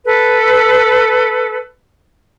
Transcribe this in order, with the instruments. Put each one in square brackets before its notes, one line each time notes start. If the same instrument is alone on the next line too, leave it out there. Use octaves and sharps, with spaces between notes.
[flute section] A4 B4